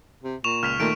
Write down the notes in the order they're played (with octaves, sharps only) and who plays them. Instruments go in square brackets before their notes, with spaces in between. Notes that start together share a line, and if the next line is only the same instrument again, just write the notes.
[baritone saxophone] C3
[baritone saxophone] A#2 [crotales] C#6 E7 F7
[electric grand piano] C#2 [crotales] F6 B6 F7
[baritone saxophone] A#2 [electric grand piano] D#3 A3 [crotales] D7